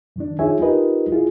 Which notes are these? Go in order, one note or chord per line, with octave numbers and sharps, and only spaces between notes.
F#2 D#3 D4
D#4 F4 G#4 C#5 E5 G#5
D#4 F4 G4 A#4 B4 D#5
E4 F4 G#4